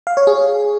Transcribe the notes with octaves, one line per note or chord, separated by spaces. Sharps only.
F5
C#5
G#4